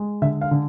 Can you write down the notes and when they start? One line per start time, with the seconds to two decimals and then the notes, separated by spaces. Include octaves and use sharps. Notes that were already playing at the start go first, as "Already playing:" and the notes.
Already playing: G#3
0.22 D3 E5
0.41 F5
0.51 D3